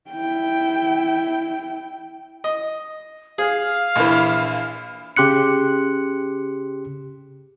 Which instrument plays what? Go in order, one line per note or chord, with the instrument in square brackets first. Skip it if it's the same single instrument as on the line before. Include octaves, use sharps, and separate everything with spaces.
[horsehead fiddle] E4 G5
[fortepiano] D#5
[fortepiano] G#4 [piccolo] F5
[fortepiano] A#1 E3
[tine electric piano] C#3 G4 C6 F#6 C#7